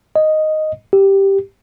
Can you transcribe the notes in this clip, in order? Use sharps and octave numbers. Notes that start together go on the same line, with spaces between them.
D#5
G4